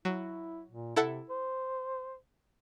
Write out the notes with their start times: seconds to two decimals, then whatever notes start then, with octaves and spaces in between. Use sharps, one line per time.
0.05 F#3 E4
0.70 A#2
0.96 C3 E4 A4 F#5
1.30 C5